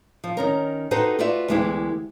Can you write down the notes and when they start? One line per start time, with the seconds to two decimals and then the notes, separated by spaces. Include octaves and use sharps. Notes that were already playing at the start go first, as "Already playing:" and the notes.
0.24 F3
0.37 D#3 C#4 A#4
0.91 D#4 F#4 G4 A4 B4 C5
1.19 F4 F#4 B4 D5 E5
1.48 D2 E3 G#3 B3 E4 G4